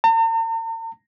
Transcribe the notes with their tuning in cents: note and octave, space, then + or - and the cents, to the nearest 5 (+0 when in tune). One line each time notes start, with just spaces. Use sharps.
A#5 -45